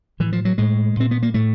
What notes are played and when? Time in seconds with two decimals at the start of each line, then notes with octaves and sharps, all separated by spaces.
0.20 A2 E3
0.33 F3
0.45 F#3
0.58 A2 G#3
0.97 A#2 C4
1.11 B3
1.23 A#3
1.34 A2 A3